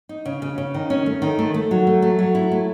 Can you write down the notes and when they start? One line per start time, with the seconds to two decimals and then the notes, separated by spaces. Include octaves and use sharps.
0.09 D#4
0.25 C#3
0.42 C#3
0.58 C#3
0.74 D#3
0.90 C#4
1.06 A3
1.22 D#3
1.39 A3
1.54 A3
1.71 F#3
1.87 A3
2.02 A3
2.19 F#3
2.35 E4
2.52 A3